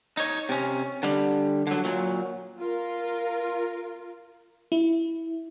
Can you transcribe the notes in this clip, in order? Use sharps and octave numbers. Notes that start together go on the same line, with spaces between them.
D#4 C#5
C3 C#4
D3 G3
D3 F#3
A#2 F#3
F4 A#4
E4